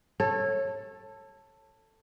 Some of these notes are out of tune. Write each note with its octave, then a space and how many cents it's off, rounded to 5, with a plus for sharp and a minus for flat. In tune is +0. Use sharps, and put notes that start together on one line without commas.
A4 +10 C#5 -25